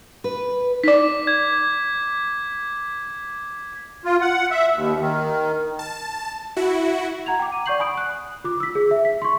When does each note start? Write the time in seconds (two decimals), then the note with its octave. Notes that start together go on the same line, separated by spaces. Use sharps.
0.24 B4
0.84 D#4 D5 D6 B6
1.27 G#6
4.05 F4
4.21 F#5
4.51 E5
4.75 D#2
5.01 D#3
5.79 A5
6.56 E4 F#4
7.26 F#5 A#5 G#6 F7
7.39 G5 D6
7.52 D#7
7.66 D5 F#5 C#6 G6 C7 F#7
7.79 G#5 B5 D#6 D7
7.98 F#6
8.44 F4 D6
8.60 E6 B6
8.75 G#4
8.91 E5
9.05 B6
9.22 C6 C#6